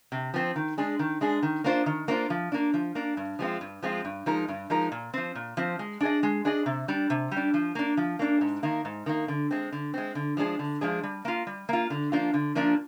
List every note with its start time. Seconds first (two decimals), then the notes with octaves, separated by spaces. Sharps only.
0.12 C3
0.34 F3 C4
0.56 D#3
0.78 G#3 D4 G#4
0.99 D#3
1.21 G#3 D4 G#4
1.43 D#3
1.64 A#3 D4 F4 C5
1.86 D#3
2.08 A#3 D4 F4 C5
2.30 F3
2.52 A#3 D4
2.74 F3
2.95 A#3 D4
3.17 G2
3.39 F3 G#3 C4 F4
3.61 G2
3.83 F3 G#3 C4 F4
4.05 G2
4.26 F3 G#3 D#4 A#4
4.48 G2
4.70 F3 G#3 D#4 A#4
4.92 A#2
5.14 F3 C4
5.35 A#2
5.57 F3 C4
5.79 G#3
6.01 D4 G#4 D#5
6.23 G#3
6.45 D4 G#4 D#5
6.66 C3
6.88 G3 D4
7.10 C3
7.32 G3
7.37 D4
7.54 F3
7.75 A#3 D4
7.97 F3
8.19 A#3 D4
8.41 G#2
8.63 D#3 A#3
8.85 G#2
9.06 D#3 A#3
9.28 D3
9.51 G#3 C4
9.72 D3
9.94 G#3 C4
10.15 D3
10.37 F3 G#3 D4 G#4
10.59 D3
10.81 F3 G#3 D4 G#4
11.03 G3
11.25 A#3 F4
11.47 G3
11.69 A#3 F4
11.90 D3
12.12 F3 A#3 D4 F4
12.34 D3
12.55 F3 A#3 D4 F4